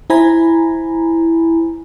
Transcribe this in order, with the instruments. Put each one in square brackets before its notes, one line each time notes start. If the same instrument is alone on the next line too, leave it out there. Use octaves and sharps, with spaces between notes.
[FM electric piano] E4 C5 G#5 A#5 B5